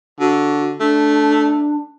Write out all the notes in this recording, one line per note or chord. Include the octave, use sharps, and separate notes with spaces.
D3 F#4
A3 D4